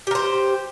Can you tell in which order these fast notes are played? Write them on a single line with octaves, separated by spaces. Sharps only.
G4 A#4 C5